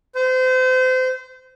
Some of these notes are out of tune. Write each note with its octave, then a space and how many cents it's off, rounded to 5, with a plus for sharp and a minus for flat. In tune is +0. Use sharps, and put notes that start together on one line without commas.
C5 -30